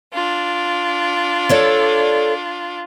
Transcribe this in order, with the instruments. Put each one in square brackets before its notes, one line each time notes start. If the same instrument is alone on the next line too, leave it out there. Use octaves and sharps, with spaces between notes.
[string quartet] D4 F4
[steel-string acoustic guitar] A4 C#5 D5